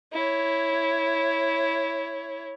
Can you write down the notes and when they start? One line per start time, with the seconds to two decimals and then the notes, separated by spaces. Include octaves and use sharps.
0.13 E4 C#5